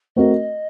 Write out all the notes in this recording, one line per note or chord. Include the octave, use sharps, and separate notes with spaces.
A3 C4 F#4 A#4 D#5